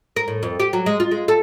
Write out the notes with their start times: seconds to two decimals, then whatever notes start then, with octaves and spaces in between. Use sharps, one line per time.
0.16 A#4
0.28 A2
0.43 F2
0.60 G4
0.73 F#3
0.86 G#3
1.00 F4
1.11 G#3
1.28 A4